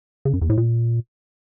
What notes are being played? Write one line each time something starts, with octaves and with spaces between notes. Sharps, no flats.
C#3
F#2
E2
A2
A#2